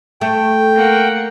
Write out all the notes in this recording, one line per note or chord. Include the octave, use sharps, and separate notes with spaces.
A3 G5
A#3 F#5